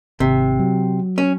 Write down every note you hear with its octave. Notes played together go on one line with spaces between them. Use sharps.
G#1 C3
F#3
C#4